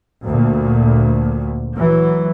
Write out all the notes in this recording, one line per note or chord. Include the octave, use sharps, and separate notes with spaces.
D2 A#2
E3 F#3